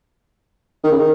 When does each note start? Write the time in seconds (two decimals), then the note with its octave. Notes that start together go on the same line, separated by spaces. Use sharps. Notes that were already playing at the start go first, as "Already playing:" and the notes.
0.84 D#3
0.91 C#3
0.99 D#3